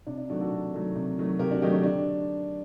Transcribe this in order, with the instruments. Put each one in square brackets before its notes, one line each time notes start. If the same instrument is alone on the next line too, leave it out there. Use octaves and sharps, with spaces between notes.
[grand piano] C3 D4
D4
D#3 F#3 A3 D4 F#4
F#4 A4
C3
D#3 F#3 A3
C3
D#3 F#3 A3
C3 G4 A#4
D4 F#4
D#3 F#3 A3 D#4 G4
D4
D3 D4